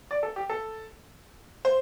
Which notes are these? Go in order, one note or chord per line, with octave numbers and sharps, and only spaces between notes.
D5
A4
G4
A4
C5